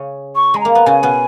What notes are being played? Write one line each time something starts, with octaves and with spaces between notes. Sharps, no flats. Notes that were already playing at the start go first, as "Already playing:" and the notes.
Already playing: C#3 C#4
C#6
G#3 G#5
A#3 A#5
B3
C#3 C#4 G#5
B2 B3